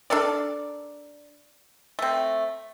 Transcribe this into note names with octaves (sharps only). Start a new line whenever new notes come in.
D4 A4 A#4 D5
A3 C4